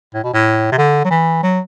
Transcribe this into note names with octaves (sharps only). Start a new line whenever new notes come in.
A2
B2
A2
C3
D3
F#3
E3
F#3